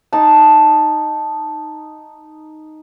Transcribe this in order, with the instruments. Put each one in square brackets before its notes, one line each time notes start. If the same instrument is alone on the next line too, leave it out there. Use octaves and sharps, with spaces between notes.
[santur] D#4 A5